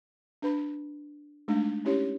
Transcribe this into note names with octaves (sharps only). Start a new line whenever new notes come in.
D4 B4 B5
G#3 A3 D4 D#4
C#4 D#4 E4 G4 C#5